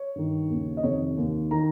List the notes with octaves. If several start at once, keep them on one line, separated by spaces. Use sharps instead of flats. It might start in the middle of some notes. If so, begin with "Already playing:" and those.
Already playing: C#5
G2 D#3
D#2 C#3
D#5
F2 C3 D#3 C#5
D#2 D#3
D#3 A#5